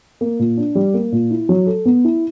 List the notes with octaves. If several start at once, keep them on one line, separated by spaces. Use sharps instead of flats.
A#3
A#2
D4
G3
A#3
A#2
E4
F#3
A4
B3
E4